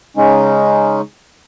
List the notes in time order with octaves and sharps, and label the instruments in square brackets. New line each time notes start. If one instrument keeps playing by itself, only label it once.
[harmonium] C#3 G#3 C#4 D#4